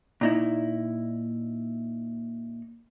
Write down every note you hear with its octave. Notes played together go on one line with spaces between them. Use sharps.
A#2 D#4 E4